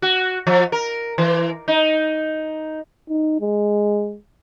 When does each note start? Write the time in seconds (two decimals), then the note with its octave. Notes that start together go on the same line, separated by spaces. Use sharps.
0.02 F#4
0.47 F3
0.72 A#4
1.18 E3
1.68 D#4
3.09 D#4
3.41 G#3